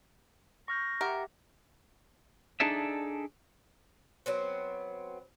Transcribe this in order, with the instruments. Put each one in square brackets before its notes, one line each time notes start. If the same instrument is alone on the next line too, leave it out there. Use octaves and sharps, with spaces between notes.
[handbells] C#6 F6 G6 [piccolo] A#6
[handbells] G4 E5 F#5 [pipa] A#4
[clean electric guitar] D4 D#4 G#4 A4 D5 E5
[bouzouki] F#3 B3 C4